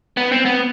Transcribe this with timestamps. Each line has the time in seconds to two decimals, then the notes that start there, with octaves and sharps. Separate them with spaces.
0.17 B3
0.32 C4
0.45 B3